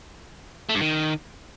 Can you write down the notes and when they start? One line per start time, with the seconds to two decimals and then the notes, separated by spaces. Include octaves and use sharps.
0.69 A3
0.75 G2
0.81 D#3